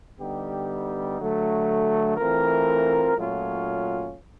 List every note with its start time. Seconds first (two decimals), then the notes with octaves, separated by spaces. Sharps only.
0.19 D3 G3 B3 D#4 G4
1.18 D3 F#3 A3
2.17 E3 A3 C4 F4 A#4
3.16 A#2 F#3 A3 C#4 F4